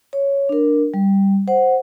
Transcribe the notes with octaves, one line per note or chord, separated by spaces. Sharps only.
C#5
D4 A#4
G3
C5 F#5